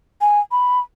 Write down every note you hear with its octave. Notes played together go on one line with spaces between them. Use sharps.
G#5
B5